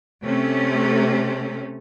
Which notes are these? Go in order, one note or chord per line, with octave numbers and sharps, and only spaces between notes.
C3 A3 C#4